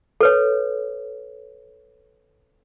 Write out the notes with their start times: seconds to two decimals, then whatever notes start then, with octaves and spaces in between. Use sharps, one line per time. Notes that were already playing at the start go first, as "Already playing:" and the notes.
0.21 A4 B4 C#5